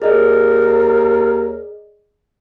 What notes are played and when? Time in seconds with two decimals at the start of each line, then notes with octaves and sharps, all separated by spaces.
0.02 D#2 G#4 A#4 D5 D#5